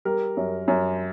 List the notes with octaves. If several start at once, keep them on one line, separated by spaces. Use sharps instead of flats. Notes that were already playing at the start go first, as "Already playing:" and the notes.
G3 A#4
F#2
F#2